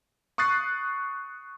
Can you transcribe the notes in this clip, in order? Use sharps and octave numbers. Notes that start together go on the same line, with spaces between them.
C#6 D#6 F#6 A6 C7